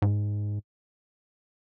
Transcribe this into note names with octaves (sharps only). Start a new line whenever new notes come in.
G#2